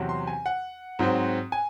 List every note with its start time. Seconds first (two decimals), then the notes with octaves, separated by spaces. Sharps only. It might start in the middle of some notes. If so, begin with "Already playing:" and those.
Already playing: E2 C3 F#3 C4
0.09 C6
0.27 G#5
0.46 F#5
0.99 G#2 F#3 C4
1.52 G#5